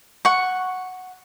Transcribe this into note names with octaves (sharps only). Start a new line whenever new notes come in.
F#5 C#6